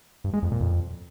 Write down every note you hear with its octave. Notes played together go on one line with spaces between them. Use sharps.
G2
G#3
F2
A#2
F2